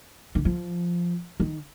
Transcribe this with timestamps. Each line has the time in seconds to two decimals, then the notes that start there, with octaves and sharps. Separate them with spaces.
0.35 D#3
0.45 F3
1.40 D#3